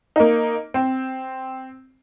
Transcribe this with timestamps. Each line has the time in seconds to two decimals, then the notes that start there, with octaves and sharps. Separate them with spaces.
0.16 A#3 D#4
0.74 C4